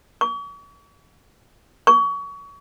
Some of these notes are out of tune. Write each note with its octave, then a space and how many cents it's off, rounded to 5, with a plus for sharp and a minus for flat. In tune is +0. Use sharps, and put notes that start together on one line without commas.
C#6 +40
C#6 +30